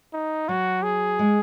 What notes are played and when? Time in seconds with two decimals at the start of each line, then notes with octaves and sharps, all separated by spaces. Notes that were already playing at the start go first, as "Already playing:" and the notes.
0.13 D#4
0.49 F#3 F#4
0.83 G#4
1.19 G#3